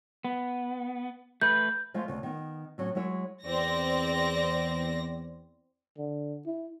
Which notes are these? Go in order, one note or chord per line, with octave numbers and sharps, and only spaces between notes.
B3
A3 B4 G6
F3 G#3 A3 F4 F5
D2 C#3
D#3 B3
A2 F#3 C#4
F#3 G#3 E4 C#5
E2 C4 D5 A#6
D3
E4